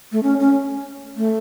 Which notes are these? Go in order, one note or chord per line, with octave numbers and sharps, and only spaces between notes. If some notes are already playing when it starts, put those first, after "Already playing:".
A3
C#4
C#4
A3